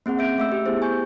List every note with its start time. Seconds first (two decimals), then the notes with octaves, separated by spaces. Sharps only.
0.06 A#3 C4 G#4 F#5
0.18 C#4 E5 G6 D7
0.38 A3 E5 E6
0.52 G4
0.66 B3 E4 G4 G#4 C5
0.82 G#5 C#6 G6